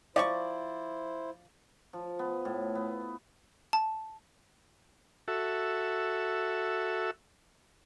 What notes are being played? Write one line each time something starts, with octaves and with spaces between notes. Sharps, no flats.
F3 E4 G4 C5 D5 C#6
F3
B3
A2
B3
A5
F#4 A4 E5